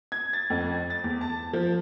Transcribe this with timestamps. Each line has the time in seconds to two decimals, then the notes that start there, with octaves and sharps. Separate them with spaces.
0.12 G#6
0.33 A6
0.50 F2
0.90 A6
1.04 E2
1.21 A5
1.53 F3